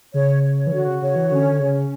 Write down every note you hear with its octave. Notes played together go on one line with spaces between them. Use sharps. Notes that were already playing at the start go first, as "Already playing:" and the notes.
C#3 C#5
C#5
E3
D3 F#4
C#3
C#3 C#5
E3
D3 C#4
D3
C#3 C#4